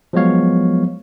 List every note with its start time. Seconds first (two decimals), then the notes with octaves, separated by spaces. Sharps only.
0.13 F3 F#3 G#3 B3 C#5 F5